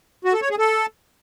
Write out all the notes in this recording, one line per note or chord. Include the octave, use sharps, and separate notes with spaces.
F#4
A4
C#5
G#4
A4